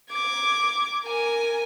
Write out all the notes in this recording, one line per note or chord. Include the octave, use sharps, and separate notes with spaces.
D6 G#6
A#4 G#5